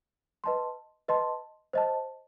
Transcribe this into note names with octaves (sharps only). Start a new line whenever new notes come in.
B4 D#5 A5 C6
B4 D#5 A5 C6
C5 D#5 A5